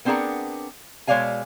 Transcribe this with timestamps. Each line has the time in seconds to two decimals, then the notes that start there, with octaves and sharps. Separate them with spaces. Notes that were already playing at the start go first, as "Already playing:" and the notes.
0.05 B3 C4 D4 G#4 A#4 F#5
1.07 B2 G#3 C#5 D5 F5 G#5